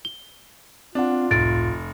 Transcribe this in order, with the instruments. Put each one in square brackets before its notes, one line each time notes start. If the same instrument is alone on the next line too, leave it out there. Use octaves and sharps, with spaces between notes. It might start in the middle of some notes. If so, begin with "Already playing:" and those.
[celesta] G7
[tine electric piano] C4 F#5 [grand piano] D4 [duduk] F4
[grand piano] F1 [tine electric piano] C#2 A2 [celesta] A6 D7